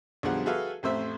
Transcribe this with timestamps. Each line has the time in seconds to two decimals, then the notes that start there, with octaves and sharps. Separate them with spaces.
0.23 B1 D3 F3 G3 G#4 F#5
0.46 F#4 G#4 A4 B4 E5 F5
0.83 A1 F2 A3 C5 E5 E6